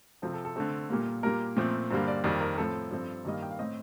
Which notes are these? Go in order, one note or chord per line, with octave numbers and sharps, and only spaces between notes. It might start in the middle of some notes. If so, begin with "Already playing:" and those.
C3 F3 C4 A4
A4
A4
D3 A3 C4 A4
A#2 G3 A#3
A#2 G3 A#3 A#4
A#2 F3 A3 C4
G2 D3 G3 A#3 C5
D5
F2 D#3 G3 A#3 D5
A#4
A2 F3 C4 A4
G2 F3 C4
G2 D#3 G3 A#3 D#5
F5
G5
F5
A2 A3 C4 D#5